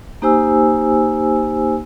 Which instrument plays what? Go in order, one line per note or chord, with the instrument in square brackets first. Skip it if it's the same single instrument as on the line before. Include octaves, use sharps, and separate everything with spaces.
[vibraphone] A#3 D#4 G4 C5 G#5 E6